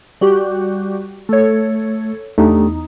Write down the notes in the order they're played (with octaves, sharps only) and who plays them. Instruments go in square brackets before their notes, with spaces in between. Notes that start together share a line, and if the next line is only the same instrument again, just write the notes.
[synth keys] G3 F#4 G4
[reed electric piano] A3 [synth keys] A4 C#5
[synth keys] E2 D#4 [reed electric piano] A3 D4 G4